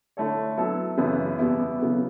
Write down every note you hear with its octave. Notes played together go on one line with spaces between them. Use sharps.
D3 A3 E4 A4 C#5
F#3 B3 E4 A4
F#2 C#3 E3 B3
E2 B2 G3 B3 E4
C#3 F#3 B3